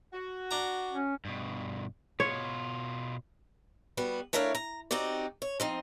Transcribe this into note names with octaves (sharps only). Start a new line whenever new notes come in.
F#4
D4 A#5
C#4
G2 B2
B2 F4 C#5
G3 B3 F#4
A3 D4 E4 A#4 C#5 F5
A#5
C4 D#4 F#4 G4 D5
C#5
F3 C4 D#4